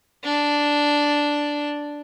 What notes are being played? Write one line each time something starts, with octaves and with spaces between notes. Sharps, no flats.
D4